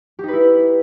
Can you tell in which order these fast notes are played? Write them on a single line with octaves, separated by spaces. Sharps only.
G4 D#4 B4 E4